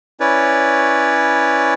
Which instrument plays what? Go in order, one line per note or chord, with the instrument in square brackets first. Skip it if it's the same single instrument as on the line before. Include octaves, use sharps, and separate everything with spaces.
[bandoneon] C#4 E4 B4 C#5 D5